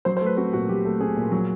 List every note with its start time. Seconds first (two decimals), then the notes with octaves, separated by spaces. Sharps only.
0.05 F#3 C5
0.17 C5
0.21 A3
0.26 B4
0.37 C4 F#4
0.53 A#2 F#4
0.69 F#3 G4
0.85 A3
1.00 C4 G#4
1.17 A#2
1.32 F#3